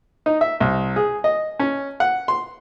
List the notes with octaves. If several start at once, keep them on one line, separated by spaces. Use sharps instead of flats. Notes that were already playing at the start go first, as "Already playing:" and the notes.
D#4
E5
C2
G#4
D#5
C#4
F#5
C6